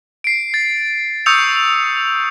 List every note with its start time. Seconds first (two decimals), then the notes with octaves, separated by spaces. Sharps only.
0.24 C7 D7
0.54 A6
1.26 C#6 D#6 E6 G6 C#7 F7